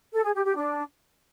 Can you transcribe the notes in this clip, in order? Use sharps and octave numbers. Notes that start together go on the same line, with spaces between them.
A4
G#4
G4
G4
D4